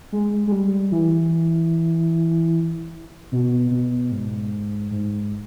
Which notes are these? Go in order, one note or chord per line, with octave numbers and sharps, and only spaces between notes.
G#3
G#3
G3
E3
B2
B2
G#2
G#2